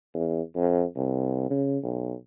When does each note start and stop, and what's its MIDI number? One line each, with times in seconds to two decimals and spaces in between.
0.14 0.41 40
0.55 0.84 41
0.96 1.45 36
1.50 1.78 49
1.83 2.14 35